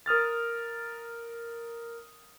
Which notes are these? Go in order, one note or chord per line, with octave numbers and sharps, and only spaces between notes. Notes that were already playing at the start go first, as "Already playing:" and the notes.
A#4 D#6 F6 A6